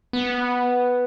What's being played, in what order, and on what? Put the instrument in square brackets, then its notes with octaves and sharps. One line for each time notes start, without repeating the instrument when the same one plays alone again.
[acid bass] B3